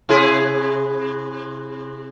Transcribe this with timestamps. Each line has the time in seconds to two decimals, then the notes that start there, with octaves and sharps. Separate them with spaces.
0.09 C3 E4 G#4